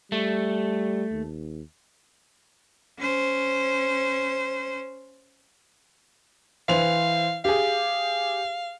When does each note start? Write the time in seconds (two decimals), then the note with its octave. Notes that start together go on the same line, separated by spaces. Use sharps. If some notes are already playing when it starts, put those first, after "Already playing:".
0.12 G3 A3
1.12 D#2
2.99 C#4 C5
6.69 E3 C5 F5 F7
7.45 G4 G#4 F5